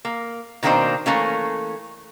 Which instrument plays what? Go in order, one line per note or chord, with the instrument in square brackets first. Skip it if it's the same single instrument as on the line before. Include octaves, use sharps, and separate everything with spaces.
[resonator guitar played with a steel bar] A#3
B2 D#3 A#3 C4 D4 C5
E3 A3 A#3 C#4